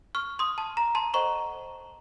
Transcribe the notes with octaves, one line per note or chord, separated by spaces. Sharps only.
C#6 F6
C6 D#6
A5
A#5
A5 C6
A4 C5 D#5 F#5 A#5 C#6